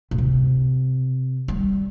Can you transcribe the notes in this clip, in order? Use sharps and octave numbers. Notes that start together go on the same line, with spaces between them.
A#2
C3
G3